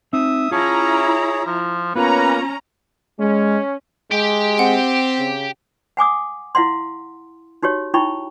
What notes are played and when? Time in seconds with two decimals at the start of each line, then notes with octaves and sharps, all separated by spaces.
0.13 C4 D#4 E5 D#6
0.51 C#4 E4 F4 G#4 C#5 A5 A#5
1.46 F3
1.95 A#3 B3 C#4 F4 B4 A#5
3.19 G#3 C#4
4.11 G#3 G4 G5
4.59 C4 F#5
5.18 C#3
5.97 F#5 G#5 D6 D#6
6.55 E4 F5 F#5 C6
7.63 D#4 F#4 G4 C#5
7.94 D#4 E4 G5 B5 C#6